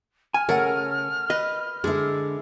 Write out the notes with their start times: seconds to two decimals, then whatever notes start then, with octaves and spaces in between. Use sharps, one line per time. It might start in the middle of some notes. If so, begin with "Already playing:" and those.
0.34 G#5 F6
0.49 C#3 A3 A#4 C#5 F#5
1.30 B4 D#5
1.84 D3 G#3 E4